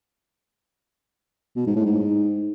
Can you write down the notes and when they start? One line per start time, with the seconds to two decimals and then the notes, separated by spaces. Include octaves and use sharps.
1.56 B2
1.66 G#2
1.76 A2
1.86 G#2